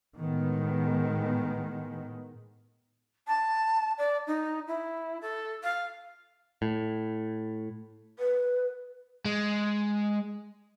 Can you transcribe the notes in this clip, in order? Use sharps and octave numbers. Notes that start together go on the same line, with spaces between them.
A2 D#3 G#3 B3
A5
D5
D#4
E4
A4
F5
A2
B4
G#3